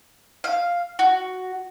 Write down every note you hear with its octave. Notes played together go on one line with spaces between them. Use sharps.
F5
F#4